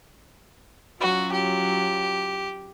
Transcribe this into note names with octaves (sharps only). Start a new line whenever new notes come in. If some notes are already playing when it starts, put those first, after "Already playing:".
F#3 C#4 F4 F#4
G4